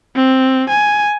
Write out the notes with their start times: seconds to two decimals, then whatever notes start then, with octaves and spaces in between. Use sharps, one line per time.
0.16 C4
0.69 G#5